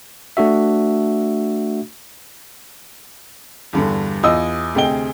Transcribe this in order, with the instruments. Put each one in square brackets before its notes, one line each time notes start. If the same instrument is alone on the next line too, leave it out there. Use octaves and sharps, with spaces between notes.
[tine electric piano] A3 D4 F#4 E5
[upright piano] E2 G2 D3
E2 F4 D#5 D#6 E6
D2 C3 G#4 D#5 G5 G7